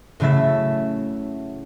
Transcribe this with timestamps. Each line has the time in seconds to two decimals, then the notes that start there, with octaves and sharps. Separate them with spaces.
0.20 A2 C#3 F#3 A3 E5 A6